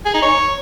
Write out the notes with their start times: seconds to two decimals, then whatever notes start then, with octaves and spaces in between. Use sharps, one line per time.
0.06 G#4
0.14 D#4
0.23 C#5